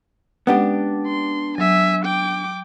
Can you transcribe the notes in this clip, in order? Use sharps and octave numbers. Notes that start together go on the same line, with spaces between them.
G#3 B3 C#4 D4 G4 F#5
C6
F#3 E5 G#5
G5 D6